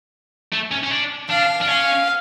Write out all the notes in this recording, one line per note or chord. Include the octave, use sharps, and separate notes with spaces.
A3
C#4
C#4
D4
D4 F5
D4
C#4 F5